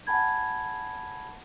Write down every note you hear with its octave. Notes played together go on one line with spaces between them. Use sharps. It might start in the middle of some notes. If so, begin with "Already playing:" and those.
F#5 G#5 A5 B5 G#6